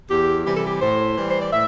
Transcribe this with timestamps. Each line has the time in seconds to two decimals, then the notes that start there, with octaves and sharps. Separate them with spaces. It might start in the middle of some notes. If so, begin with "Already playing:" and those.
0.09 E2 G4
0.45 C3 E3 G3 G4
0.56 A4
0.66 G4
0.80 A2 C5
1.16 E3 G3
1.30 C5
1.41 D5
1.52 A2 E5